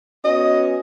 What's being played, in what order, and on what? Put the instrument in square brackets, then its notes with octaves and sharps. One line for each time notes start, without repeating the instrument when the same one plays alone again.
[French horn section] B3 C#4 F#4 [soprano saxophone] D#5